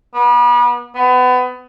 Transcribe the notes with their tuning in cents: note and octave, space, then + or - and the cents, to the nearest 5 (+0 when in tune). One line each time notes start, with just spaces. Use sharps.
B3 -35
B3 +25